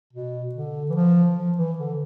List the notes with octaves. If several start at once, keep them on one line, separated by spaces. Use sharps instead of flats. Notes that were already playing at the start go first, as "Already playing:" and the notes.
B2
D3
E3
F3
F3
E3
D3